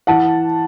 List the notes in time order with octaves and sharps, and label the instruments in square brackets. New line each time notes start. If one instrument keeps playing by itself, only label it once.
[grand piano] E3 F#5 A5